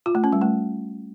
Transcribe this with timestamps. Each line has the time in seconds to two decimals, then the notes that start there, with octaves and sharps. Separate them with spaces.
0.06 F4
0.15 A3
0.24 C#4
0.33 G3
0.41 A3